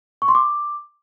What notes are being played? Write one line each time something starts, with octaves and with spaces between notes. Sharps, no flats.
C#6
C6
D6